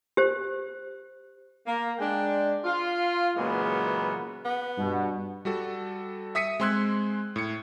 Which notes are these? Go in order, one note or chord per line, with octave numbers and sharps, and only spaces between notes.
G4 C5
A#3
G#3 D4 G5
F4
A#2 C#3 E3 F#3 G#3 B3
B3
G2 B2
G3 F#4 A4
E5 D#6 B6 C#7 D#7
G#3 C4 C6 E6 F#6 G#6
A2 C#7